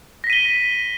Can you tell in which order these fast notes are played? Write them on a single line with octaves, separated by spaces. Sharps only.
A#6 B6 D#7 G7